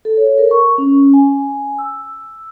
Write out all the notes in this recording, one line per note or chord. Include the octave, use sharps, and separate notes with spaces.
A4
C#5
A#4
C#6
C#4
G#5
E6